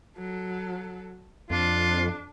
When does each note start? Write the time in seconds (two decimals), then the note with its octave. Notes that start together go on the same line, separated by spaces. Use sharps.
0.18 F#3 A4
1.50 F2 D4 F4